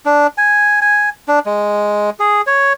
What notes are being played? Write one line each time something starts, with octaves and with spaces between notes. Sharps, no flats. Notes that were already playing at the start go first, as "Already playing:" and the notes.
D4
G#5
G#5
D4
G#3
G#4
C#5